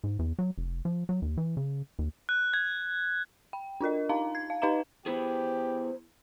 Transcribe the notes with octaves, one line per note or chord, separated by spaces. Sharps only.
G#2
E2
F#3
F1
F3
F#3
D#2
E3
C#3
D#2
F#6
G#6
G5
D4 F4 A#4 D#5
D#4 F5 A#5
G#6
F5
D#4 B4 D#5 F5 A#5 E7
B3 E4 G4 G#4 C5